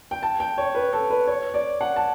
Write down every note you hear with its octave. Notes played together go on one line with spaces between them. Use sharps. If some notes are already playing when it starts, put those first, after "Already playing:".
G5
A5
G5
C#5
B4
A4
B4
C#5
D5
F#5
A5